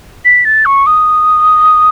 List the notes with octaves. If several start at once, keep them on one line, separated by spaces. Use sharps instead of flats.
B6
A6
C#6
D#6